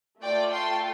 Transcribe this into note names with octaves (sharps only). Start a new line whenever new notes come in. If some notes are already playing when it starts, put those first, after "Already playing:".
A3 F4 A4 D5 G5
G5 C6